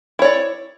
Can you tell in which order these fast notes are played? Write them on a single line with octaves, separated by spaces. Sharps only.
E4 C#5 D5